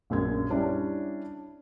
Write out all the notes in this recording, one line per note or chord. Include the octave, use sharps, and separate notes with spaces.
A#1 F#2 G#6
G3 C#4 D4 E4